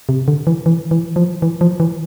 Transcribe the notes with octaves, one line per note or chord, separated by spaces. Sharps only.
C3
D3
E3
E3
E3
F3
E3
F3
E3